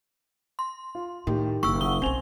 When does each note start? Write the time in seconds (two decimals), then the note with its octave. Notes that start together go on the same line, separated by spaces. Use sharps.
0.59 C6
0.95 F4
1.27 A2 D#3 G4
1.63 F#1 C#6 E6
1.81 F#5 D#6 G7
2.02 B1 C4 C#4 G#5 F7